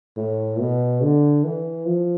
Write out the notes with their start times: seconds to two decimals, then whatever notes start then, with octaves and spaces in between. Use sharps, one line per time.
0.17 A2
0.59 B2
1.02 D3
1.44 E3
1.86 F3